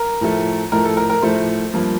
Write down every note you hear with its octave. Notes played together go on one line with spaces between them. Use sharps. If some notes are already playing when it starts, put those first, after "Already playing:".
Already playing: A#4
A2 F3 A3
A2 F3 A3 A#4
A4
A#4
A#4
A2 F3 A3 C5
G2 F3 A#3